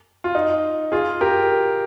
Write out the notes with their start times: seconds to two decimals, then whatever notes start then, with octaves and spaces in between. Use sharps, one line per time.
0.24 F4
0.35 D#4
0.92 F4 G#4
1.21 G4 A#4